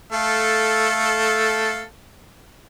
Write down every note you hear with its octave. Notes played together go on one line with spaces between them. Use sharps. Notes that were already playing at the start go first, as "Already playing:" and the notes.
A3 A4 F5